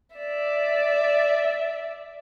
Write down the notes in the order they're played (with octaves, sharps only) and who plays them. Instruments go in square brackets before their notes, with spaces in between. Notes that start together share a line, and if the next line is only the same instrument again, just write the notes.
[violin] D5 E5